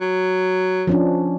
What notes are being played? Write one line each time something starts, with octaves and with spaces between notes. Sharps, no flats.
F#3
F3 C#4 D4